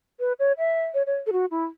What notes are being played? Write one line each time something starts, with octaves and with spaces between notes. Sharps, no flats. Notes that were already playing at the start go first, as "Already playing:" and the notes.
B4
C#5
E5
C#5
C#5
A4
F#4
E4